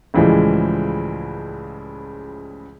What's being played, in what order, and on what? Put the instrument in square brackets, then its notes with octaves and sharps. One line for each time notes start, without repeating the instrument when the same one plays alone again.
[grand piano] C#2 A2 E3 F3 G3 G#3